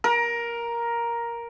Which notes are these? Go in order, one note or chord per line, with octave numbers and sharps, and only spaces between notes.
A#4